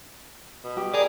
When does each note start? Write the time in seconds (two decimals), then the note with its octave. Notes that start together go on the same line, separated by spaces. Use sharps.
0.64 B2
0.77 G4
0.94 G#4 A#4 D5